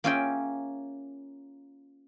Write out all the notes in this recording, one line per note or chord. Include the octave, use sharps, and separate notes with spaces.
A#3 C#4 F4 G#4 E5 G5